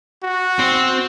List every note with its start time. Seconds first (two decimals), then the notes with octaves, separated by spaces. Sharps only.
0.23 F#4
0.59 C4